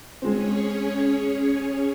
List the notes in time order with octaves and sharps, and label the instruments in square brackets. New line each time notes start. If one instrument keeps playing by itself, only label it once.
[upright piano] G#3 C4 [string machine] C#4 G#4 C#5